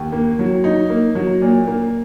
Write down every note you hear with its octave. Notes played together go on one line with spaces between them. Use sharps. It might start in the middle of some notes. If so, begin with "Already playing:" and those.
Already playing: D#2
A#3
F#3
D#4
A#3
F#3
A#2
A#3